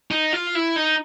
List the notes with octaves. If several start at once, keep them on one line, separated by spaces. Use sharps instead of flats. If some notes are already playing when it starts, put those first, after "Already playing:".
D#4
F4
E4
D#4